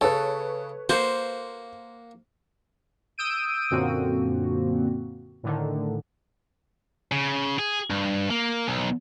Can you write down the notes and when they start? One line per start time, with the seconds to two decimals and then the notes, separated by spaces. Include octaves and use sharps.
0.01 C#3 A4 B4 C#5
0.89 A#3 F#4 C5
3.18 D#6 E6 G6 D7 D#7
3.71 F#2 A#2 D3 A#3 C4 F#4
5.43 A2 D3 D#3
7.12 C#3
7.59 G#4
7.90 G2
8.30 A#3
8.68 B1